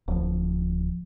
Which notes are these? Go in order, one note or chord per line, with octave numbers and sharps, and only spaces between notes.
D1 F3